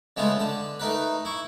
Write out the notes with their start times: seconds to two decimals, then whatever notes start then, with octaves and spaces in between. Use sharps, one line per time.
0.17 C#3 G#3 A3 B3 F4
0.39 D3 A5
0.80 A3 D#4 A#4 B4
1.25 E4 C#6